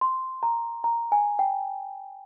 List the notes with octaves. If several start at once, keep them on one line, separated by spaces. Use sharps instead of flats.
C6
A#5
A#5
G#5
G5